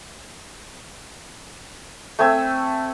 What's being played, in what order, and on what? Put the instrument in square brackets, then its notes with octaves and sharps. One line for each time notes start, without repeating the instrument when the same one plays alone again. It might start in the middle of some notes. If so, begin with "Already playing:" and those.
[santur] A3 C4 G#5 E6